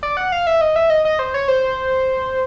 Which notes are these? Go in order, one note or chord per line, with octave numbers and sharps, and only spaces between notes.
D5
F#5
F5
E5
D#5
E5
D#5
D#5
C5
C#5
C5